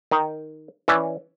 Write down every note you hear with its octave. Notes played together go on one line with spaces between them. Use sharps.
D#3 D#4 G5
E3 C#4 D5 E5